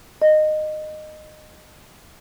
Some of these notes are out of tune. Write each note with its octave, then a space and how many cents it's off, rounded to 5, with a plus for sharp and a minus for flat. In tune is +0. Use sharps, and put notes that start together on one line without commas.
D#5 -20